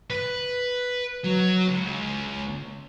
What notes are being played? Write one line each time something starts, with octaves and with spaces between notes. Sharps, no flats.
B4
F#3
C#2